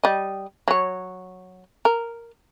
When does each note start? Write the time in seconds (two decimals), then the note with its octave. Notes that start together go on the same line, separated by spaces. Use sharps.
0.04 G3 D#5
0.68 F#3 C#5
1.85 A#4